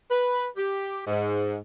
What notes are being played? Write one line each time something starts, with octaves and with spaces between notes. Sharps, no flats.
B4
G4
G#2